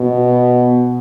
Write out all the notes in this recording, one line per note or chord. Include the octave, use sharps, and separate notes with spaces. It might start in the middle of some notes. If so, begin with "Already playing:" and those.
Already playing: B2